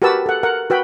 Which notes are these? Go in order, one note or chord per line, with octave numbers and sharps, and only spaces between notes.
F#4 G4 A#4 B4 A5 E6
A4 F#5
A#4 F#5
F#4 B4 G5 B5